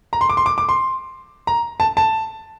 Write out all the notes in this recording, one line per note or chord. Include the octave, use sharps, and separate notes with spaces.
A#5
C6
D6
C6
D6
D6
C6
A#5
A5
A5